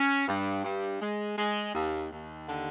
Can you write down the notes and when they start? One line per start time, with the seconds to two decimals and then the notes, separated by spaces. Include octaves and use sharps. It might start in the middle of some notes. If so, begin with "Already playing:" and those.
Already playing: C#4
0.27 G2
0.64 G2
1.00 G#3
1.37 G#3
1.74 D#2
2.10 D#2
2.47 D3